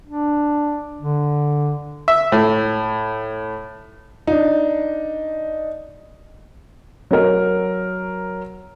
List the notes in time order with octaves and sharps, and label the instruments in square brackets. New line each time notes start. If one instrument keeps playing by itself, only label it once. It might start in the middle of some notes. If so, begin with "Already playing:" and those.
[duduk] D4
D3
[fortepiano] E5
A2
[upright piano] D4 D#4
F#3 A#4